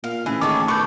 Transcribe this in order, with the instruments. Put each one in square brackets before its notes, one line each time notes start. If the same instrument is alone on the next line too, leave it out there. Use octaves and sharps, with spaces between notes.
[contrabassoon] A#2 [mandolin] F5
[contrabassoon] A1 [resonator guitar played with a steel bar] E3 [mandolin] G#4
[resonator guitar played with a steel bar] D#3 G#4 [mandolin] A4 C#5 A5 [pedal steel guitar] D6
[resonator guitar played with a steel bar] B2 [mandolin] A4 B4 [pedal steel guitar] C#6 D6 G6